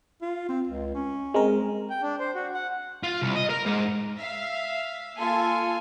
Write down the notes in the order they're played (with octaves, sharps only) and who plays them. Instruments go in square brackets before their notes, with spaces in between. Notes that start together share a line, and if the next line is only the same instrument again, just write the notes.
[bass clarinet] F4
C4
C#2
C#4
[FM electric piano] G#3 C4 A#4
[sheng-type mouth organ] G5
D4
C5
F#4
F#5
[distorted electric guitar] F4
C2
D#5
A#4
G#2
[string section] E5 F5
A#3 F4 A4 G#5